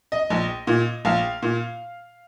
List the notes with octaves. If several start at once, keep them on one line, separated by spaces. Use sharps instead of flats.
D#5
A#1
A#2
A#1 F5
A#2